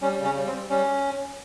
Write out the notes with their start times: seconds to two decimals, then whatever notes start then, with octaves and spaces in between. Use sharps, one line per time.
0.01 G3 C#4
0.19 C#3
0.24 C#4
0.36 G3
0.47 C4
0.53 G3
0.69 G3 C#4